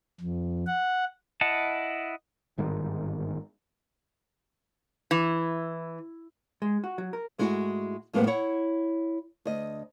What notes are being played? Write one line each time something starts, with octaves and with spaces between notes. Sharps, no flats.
F2
F#5
E4 D#5 F#5 A5
G1 G#2 D#3
E3
G#3
F#4
F#3
A#4
G#2 G#3 A3 E4 F#4
F2 A2 G#3 A#3 B4 F#5
E4 C#5 F#5
D2 D#5